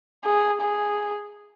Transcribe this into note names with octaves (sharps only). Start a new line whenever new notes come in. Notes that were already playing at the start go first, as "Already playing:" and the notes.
G#4
G#4